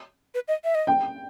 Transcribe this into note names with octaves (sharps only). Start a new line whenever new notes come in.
B4
D#5
E5
D#5
G5